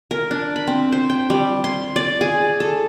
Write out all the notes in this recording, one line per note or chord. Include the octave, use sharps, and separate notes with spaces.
A#4
D4
B5
C4
C5
G5
G3
C6
D5
G#4
A4